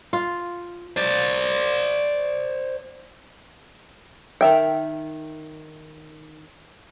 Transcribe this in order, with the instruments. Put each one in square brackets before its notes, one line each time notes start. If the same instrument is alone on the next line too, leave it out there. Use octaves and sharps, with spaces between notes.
[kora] F4
[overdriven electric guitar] C5 D5
[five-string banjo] D#3 E5 G5